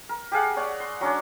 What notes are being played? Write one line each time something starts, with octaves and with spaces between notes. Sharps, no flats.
A#4
G4 G#4 F5 F#5
C#5 D5 F#5
C6
F#3 C#4 D4 C#5